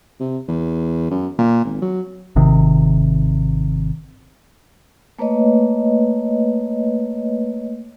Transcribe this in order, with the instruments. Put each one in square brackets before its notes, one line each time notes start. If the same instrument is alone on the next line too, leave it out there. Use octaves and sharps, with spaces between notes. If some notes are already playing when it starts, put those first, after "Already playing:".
[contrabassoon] C3
E2
F#2
A#2
G#1
F#3
[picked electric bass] G#1 C3 D#3
[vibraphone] A3 A#3 B4 C#5 D#5